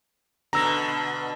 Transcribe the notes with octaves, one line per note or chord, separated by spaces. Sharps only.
B2 D3 A#5 E6 A#6